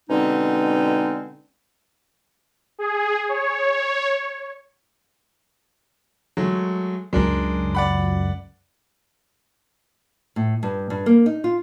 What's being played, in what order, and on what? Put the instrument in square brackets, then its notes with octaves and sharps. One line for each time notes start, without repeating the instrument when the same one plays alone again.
[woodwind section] B2 D3 G#3 C4 C#4 D#4
[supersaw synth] G#4
C#5
[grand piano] F#3 G#3 A3
[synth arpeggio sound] C#2 F#2 [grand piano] G#3 D4 A#4
[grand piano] D5 F#5 B5
[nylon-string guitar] A2
G2
G2
A#3
D#4
F4